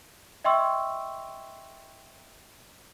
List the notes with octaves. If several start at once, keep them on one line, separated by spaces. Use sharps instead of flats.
D#5 E5 G5 C6 C#6 E6